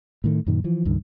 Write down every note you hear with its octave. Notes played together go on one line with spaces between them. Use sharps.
A2 D#3 A3
F#2 A#2 D#3
E3 F3
C#2 G2 D#3